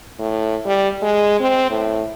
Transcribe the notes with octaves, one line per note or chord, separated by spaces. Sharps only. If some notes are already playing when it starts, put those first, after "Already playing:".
A2
G3
G#3
C4
A2